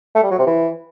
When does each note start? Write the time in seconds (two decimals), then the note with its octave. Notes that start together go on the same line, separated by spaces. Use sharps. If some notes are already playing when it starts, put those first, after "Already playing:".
0.15 A3
0.23 G3
0.31 F#3
0.39 C3
0.47 E3